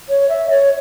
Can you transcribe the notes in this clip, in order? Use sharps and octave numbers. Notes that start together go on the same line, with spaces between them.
C#5
E5
C#5